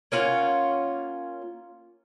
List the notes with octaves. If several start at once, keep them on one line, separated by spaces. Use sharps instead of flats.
A#3 C#4 F4 F#5